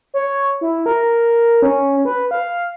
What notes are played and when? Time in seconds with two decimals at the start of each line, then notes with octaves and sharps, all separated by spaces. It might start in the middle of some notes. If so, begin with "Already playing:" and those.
0.14 C#5
0.61 E4
0.86 A#4
1.62 C#4
2.05 B4
2.31 F5